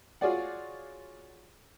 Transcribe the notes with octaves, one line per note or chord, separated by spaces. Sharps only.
F4 F#4 G#4 C#5 D5 F#5